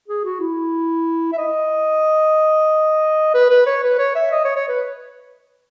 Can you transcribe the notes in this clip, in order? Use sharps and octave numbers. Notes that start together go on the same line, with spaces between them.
G#4
F#4
E4
E5
D#5
B4
B4
C#5
B4
C#5
E5
D#5
C#5
C#5
B4